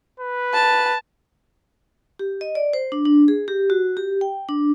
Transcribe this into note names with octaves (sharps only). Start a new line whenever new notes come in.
B4
A5
G4
D#5
D5
C5
D4
D4
G#4
G4
F#4
G4
G5
D4